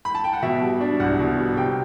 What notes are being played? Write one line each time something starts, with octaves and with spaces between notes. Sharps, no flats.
B5
A5
G5
F#5
B2 E5
G3
D4
C2 F#5
B2
G3
C3 G5